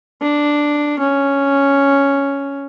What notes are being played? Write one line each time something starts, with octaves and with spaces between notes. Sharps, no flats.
D4
C#4